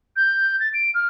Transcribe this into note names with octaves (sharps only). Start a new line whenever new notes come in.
G6
A6
D7
F6